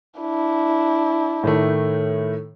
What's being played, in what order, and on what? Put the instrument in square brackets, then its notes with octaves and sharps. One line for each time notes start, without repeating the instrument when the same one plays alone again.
[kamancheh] D4 E4
[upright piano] A2 D#3 A3